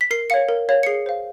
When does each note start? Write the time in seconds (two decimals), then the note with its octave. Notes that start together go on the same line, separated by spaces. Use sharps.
0.01 B6
0.11 A#4 C7
0.30 C#5 F5 C#7
0.49 A#4
0.69 C#5 F5
0.83 C#7
0.87 G#4 C7
1.06 C5 F5